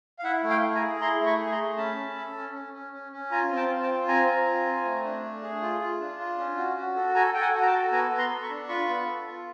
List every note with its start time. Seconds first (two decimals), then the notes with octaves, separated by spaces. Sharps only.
0.19 F5
0.24 E4 E5 F#5
0.43 A3
0.50 F5 G5
0.62 E4
0.75 G#5 A#5
0.81 G#4
1.01 E4 A#5 C6
1.20 A3
1.26 B5 C#6
1.39 G#4
1.52 A#5 C6
1.58 A3
1.77 C#4 A5 B5
1.97 C#4
2.16 A4
2.35 C#4
2.54 C#4
2.74 C#4
2.93 C#4
3.12 C#4
3.31 F4 G#5 A#5
3.51 C4
3.57 G5 A5
3.70 C4
3.82 G5 A5
3.89 F4
4.08 C4 G#5 A#5
4.27 C4
4.46 F4
4.66 C4
4.85 A3
5.04 D4
5.23 A3
5.43 G#4
5.62 F4
5.80 F4
6.00 D4
6.19 F4
6.38 C#4
6.58 F#4
6.77 F#4
6.96 A4
7.15 A4 G#5 A#5
7.34 A4 G5
7.41 F#5 G#5
7.54 F#4
7.62 A#5
7.66 G5 A5
7.73 A4
7.92 B3 G#5 A#5
8.11 B3
8.18 A#5 C6
8.30 A4
8.43 B5 C#6
8.50 D4
8.68 F4 B5 C#6
8.89 B3
9.07 A4
9.27 F4